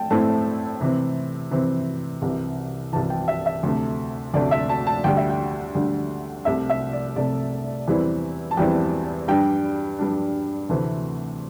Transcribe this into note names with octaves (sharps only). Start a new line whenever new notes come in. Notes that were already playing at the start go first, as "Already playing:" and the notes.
Already playing: A3 G5 A5
A2 A3 C4 E4 A5
C3 E3 C4
C3 E3 C4
C2 C3 E3
C2 C3 E3 A5
G5
E5
E5
D2 C3 A3
D2 C3 A3 D5
E5
A5
A5
D2 D3 G3 G5
E5
G5
D2 D3 G3
C2 C3 A3 E5
E5
D5
C2 C3 A3 D5
E2 E3 G3 C4 E4
A5
E2 E3 G3 C4 E4 G5
G2 G3 D4 G5
G2 G3 D4
D2 C3 E3 A3 C4